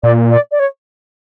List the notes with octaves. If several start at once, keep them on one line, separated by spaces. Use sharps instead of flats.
A#2 D5
D5
D5
C#5